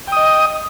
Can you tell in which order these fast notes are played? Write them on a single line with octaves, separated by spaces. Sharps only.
G5 D#6 D#5